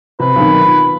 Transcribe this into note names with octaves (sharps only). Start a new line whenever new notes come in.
C3 B4
B1 D#3
F4